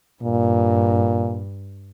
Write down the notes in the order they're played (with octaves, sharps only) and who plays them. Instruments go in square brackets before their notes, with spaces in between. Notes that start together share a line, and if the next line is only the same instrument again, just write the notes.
[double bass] G2 [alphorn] A#2